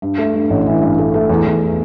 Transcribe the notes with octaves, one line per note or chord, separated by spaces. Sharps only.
G2
A3
G2
A1
E3
G2
A3
A3
E2
E2